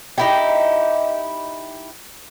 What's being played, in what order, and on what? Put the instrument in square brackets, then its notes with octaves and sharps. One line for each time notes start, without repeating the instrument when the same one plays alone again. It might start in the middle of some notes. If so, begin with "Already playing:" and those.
[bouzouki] D#4 E4 G4